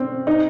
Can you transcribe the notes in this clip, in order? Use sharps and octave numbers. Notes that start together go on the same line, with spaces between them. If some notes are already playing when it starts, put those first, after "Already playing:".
Already playing: C4 C#4
D#4